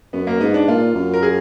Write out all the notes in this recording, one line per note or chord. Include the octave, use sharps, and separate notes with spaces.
F#2 B3
A#3
G#2 B3
D4
A#2 F4
F#2
A#4
G#4